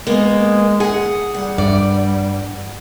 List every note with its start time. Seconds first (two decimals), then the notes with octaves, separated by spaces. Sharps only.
0.07 G#3 A#3 B3
0.80 G#4 F#5
1.34 G3 F#5
1.58 G2 D5